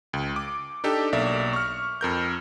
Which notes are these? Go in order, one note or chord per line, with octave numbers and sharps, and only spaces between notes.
C#2
D6
D4 D#4 G4 A4
B1 A#3 D5 E5
C#6 F6
F2 A#4 G6